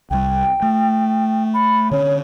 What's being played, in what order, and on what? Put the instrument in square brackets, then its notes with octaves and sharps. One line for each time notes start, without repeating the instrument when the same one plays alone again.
[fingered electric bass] C2 G3 [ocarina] G5
[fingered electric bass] A3
[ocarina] B5
[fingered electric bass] D3 C#4 [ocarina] C#5